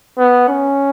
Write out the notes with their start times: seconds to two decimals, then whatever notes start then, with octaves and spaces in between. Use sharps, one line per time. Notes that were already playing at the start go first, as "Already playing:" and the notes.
0.18 B3
0.49 C#4